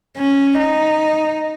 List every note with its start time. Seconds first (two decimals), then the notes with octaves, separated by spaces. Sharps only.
0.18 C#4
0.59 D#4